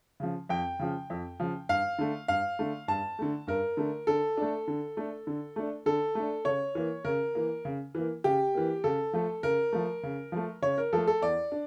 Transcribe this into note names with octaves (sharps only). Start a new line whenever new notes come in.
C#3 F3
F2 G5
C#3 F3
F2
C#3 F3
G2 F5
D3 A3
G2 F5
D3 A3
G2 A5
D3 A3
G2 A#4
D3 A3
D3 A4
A3 D4
D3
A3 D4
D3
A3 D4
D3 A4
A3 D4
C#3 C#5
E3 A#3
C#3 A#4
E3 A#3
C#3
E3 A#3
C#3 G4
E3 A#3
C#3 A4
F3 A3
C#3 A#4
F3 A3
C#3
F3 A3
C#3 C#5
A#4
F3 A3 A4
A4
E2 D5
D4